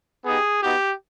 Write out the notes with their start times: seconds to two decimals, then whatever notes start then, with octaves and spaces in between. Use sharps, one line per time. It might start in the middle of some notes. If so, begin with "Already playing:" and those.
0.25 B3 D#4 G4 G#4
0.61 B3 D#4 F#4 G4